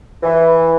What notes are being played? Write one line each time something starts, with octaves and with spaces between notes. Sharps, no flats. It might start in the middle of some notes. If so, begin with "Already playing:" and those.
E3